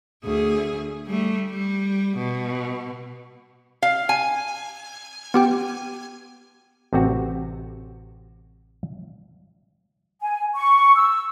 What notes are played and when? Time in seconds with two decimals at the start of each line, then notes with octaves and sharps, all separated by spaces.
0.25 D2 G#4
1.07 G3 A3
1.50 G3
2.18 B2
3.82 F5
4.09 G#5
5.34 B3 G4 G5
6.93 A1 C3 C4 F#4
10.22 G#5
10.55 C#6
10.96 E6